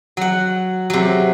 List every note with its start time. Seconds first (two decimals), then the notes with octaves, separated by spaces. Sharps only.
0.17 F#3 F#5
0.90 C3 F#3